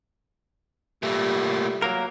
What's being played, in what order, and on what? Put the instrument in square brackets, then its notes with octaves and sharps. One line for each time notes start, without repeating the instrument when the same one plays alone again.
[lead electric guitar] A#2 A3 [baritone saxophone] G3
[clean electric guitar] F#3 A#3 A#4